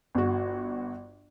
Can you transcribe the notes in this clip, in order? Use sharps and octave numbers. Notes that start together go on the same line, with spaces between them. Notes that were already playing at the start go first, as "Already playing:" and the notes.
G1 F#4